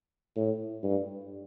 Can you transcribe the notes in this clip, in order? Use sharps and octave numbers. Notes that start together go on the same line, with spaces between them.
A2
G2